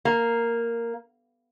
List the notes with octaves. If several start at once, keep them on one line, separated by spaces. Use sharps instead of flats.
A#3